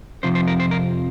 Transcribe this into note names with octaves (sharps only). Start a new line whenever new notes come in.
F2 C3 F3 C5
C5
A#4
C5
A#4